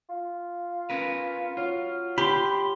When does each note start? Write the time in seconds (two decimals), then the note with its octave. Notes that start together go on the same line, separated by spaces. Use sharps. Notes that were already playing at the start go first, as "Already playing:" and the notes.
0.09 F4
0.90 C#4 A#4 B4
1.57 F#3 F4
2.18 G4 B5 C6